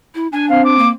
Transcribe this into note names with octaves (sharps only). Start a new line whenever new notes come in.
E4
D4 G#5
C4 F5
D6
A#3